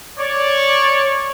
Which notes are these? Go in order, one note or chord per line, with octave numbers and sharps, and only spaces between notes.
C#5 D5